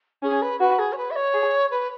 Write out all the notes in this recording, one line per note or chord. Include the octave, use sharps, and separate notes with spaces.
C#4 G#4
B4
F#4 B4
G#4
C#5
B4
E5
C#5
G#4
B4